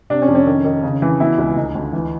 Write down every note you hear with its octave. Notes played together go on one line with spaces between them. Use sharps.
C3 D4
C#4
F2
C#4
D#3
D#3
C#3
E3
B2 E4
C#2
D2 D#4
D2
E3